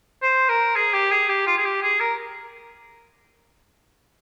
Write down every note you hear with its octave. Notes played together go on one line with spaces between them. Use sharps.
C5
A#4
G#4
G4
G#4
G4
F4
G#4
G4
G#4
A#4